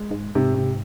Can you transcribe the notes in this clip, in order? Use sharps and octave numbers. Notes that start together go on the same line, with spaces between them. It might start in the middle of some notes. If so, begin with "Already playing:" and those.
Already playing: G#3
G#2
G#2 C3
C3